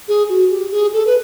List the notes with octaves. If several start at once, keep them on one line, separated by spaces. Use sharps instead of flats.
G#4
F#4
G4
G#4
A4
B4